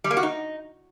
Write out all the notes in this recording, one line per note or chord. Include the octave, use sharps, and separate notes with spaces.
G3
A#3
F#4
D#4